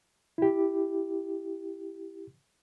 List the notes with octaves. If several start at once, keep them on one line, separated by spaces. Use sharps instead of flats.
E4 G4